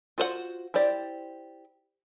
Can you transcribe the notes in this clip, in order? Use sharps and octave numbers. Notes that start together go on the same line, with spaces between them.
F4 F#4 C5 D5 F#5
E4 G4 C5 D5